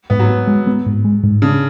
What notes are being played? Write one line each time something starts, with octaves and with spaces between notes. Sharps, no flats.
G#2 B3
F#3
B3
G#3
B3
G#2
G#3
G#2
C#3 D4